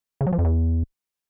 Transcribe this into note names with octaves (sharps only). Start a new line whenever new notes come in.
C#3
F#3
F3
F2
E2